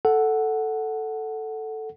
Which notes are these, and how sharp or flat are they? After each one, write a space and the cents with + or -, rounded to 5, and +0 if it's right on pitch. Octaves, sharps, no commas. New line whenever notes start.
A4 +0 F#5 +0